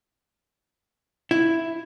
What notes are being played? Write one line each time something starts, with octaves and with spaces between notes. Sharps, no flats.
E4